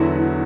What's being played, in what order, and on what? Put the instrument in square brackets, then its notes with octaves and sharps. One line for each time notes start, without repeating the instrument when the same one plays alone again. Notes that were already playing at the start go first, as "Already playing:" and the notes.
Already playing: [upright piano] E2 D3 F#3 B3 F#4 [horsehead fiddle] E4